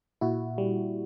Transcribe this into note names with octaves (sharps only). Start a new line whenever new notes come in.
A#2 E4 F#4
G3